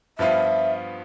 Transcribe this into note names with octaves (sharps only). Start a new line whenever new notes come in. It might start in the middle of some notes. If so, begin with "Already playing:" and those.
G2 F3 B3 F4 E5